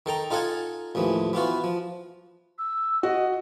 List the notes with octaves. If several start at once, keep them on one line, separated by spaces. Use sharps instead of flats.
D#3 A4 G5 A#5
D#4 F4 A4 D#5 F#5 G#5
A1 D#2 E3 F3
E3 B3 F4 F#4
F3
E6
F#4 D#5